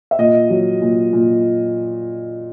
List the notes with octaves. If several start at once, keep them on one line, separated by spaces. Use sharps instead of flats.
E5
A#2 D#5
F#3
A#2
A#2